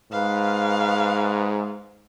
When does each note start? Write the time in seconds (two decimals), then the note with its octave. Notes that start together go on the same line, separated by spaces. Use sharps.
0.12 G#2 B4 F5